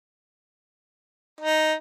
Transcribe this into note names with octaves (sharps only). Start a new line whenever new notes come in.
D#4